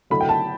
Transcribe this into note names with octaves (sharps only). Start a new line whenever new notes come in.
D3 F#3 A3 E4 B5
G5
A5